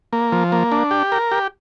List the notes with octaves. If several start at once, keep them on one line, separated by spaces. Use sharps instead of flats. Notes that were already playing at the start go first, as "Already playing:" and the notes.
A#3
F3
A#3
D4
G4
A#4
G4